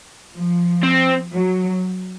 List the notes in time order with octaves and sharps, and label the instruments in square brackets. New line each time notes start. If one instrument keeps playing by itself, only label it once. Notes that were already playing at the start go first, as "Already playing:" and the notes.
[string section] F3
[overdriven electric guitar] C4
[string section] F#3